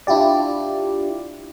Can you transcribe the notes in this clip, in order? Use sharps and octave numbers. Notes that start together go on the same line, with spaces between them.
D4 E4 F4 G4 D5